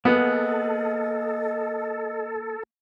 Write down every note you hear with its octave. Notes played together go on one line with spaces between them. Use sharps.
A#3 B3 G#4 A4 D#5 F#5